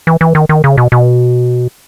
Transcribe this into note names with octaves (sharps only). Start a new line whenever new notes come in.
E3
E3
D#3
D#3
C#3
B2
B2